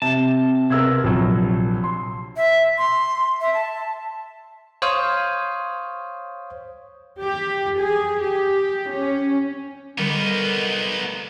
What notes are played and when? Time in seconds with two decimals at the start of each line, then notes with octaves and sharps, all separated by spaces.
0.02 C3 A5
0.70 C3 B3 A#4 E6 G#6
1.04 A#1 C3 F#3
1.84 C6
2.37 E5
2.78 C6
3.41 E5
3.54 A5
4.82 C5 C#5 F5 D#6
7.20 G4
7.79 G#4
8.21 G4
8.89 C#4
9.98 D3 G3 B3 D#4 A#4